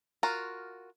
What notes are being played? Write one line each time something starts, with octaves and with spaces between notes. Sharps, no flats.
F4 F#4 A#4